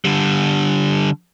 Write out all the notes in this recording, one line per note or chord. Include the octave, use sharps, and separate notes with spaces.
D3 G3